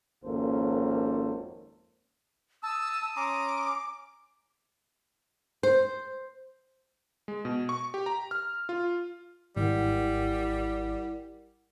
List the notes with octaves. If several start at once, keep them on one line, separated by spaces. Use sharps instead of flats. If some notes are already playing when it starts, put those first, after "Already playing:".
G#1 F2 A#3 C#4 A4 C5
A5 D#6 E6
C#4 A#5 C6 D6
C5
G#3
B2
C#6
G4
A#5
F6
F4
G#1 G3 E4 A#4 F#5